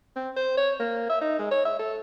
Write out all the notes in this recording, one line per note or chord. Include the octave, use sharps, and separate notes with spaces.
C4
C5
C#5
A#3
E5
D#4
G#3
C#5
E5
A4